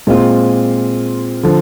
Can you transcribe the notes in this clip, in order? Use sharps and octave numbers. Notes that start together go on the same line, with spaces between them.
A#2 G#3 C4 F4
D3 F3